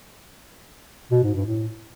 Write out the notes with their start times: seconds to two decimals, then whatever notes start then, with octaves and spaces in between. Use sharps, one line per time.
1.12 B2
1.23 G#2
1.35 G2
1.46 A2